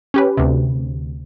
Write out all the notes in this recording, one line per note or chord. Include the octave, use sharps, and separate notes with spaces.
C#4 G4 B4
D2 C3